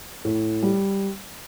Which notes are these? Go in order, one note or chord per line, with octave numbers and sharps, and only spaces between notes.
A2
G3